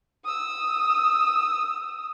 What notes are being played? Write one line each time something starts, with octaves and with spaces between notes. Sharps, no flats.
D#6 E6